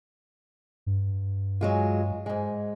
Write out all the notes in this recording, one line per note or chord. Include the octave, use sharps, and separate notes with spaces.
G2
F#3 G#3 F4
G#2 G#3